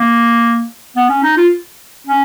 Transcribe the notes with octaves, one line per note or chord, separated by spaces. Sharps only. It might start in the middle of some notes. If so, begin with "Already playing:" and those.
Already playing: A#3
B3
C#4
D#4
F4
C#4